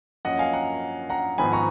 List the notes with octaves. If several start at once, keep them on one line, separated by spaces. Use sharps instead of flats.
F#2 F3 A#3 C#4 D#5 F#5
F5 G#5
F#5 A#5
F#5 A#5
G#1 G#2 F3 B3 G#5 B5
A#5 C#6